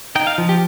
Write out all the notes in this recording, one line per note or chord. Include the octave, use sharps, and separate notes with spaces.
D#4 G5
F5
F3
G4